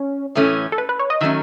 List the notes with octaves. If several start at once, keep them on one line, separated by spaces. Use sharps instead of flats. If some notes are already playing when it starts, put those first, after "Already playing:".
Already playing: C#4
A2 E3 A3 C#4
A4
B4
B4
C#5
D#5
D#3 F#3 A3 C#4 E5